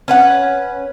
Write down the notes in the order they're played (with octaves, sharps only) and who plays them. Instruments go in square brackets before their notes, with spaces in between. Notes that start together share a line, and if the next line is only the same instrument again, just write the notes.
[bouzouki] C#4 B4 F#5